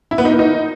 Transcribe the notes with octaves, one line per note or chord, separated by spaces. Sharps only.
E4
B3
D#4
A#3
D#4